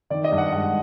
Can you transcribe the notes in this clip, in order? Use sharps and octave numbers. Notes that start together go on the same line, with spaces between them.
D#3 D5
D#5
G2
F#5
G#3 F#5